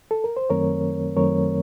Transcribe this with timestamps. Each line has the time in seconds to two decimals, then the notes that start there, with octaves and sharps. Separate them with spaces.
0.11 A4
0.24 A#4
0.37 C5
0.50 F#2 D#3 F#3 A3 C4 A#4 C#5
1.16 F#2 D#3 F#3 A3 C4 A#4 C#5